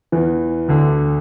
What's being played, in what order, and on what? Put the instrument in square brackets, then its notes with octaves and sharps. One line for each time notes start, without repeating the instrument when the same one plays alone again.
[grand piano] E2 E3
D2 D3